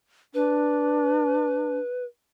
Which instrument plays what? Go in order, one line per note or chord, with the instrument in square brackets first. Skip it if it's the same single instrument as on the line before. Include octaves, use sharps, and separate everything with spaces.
[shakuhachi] D4 [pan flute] B4